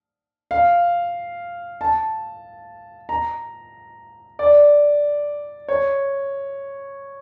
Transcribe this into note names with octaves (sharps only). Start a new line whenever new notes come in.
F5
A5
A#5
D5
C#5